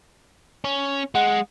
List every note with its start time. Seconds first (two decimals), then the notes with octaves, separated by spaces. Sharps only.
0.64 C#4
1.15 G#3 F#5